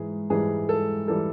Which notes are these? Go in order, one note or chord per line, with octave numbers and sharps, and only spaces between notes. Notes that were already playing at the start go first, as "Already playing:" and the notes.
Already playing: G#2 E3 G#4
G#2 E3 G3 G#4
A4
E3 G3 A4